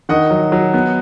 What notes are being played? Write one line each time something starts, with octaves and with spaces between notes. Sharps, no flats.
D#3 D#5 F#5
F#3
F#3
B3